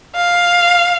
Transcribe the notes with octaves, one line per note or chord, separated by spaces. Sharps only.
F5